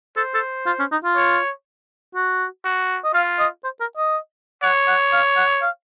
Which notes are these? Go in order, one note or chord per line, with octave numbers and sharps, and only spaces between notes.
A4 C5
A4
F4
C#4
D#4
F4
C#5
F#4
F#4
D#5
F4 F5
D#5
C5
A#4
D#5
C#5 F#5
F#5
F5
F#5
F5